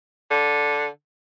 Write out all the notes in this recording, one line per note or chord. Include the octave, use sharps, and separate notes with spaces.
D3